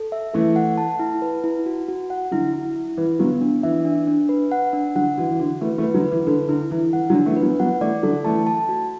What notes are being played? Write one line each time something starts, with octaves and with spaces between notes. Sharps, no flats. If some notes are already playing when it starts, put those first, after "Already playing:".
Already playing: A4
E5
E3 A3 A4
F#5
A5
E4
B4
E4
F#4
F#4
F#5
D3 F#3 E4
E4
E4
E3 B4
D3 F#3 B3
D4
E3 E5
D4
D4
B4
F#5
D4
D3 F#3 F#5
E3 F#4
E3
D3 F#4
E3 A3 B4
E3 A3
B4
D3 F#3
B4
E3
D3 A4
D3 E4
E3 E4
E3 F#5
D3 F#3
D4
E3 A3
B4
F#3 B3
F#3 B3 F#5
E3 A3 D5
D3 F#3 A4
E3 A3 A5
A5
F#4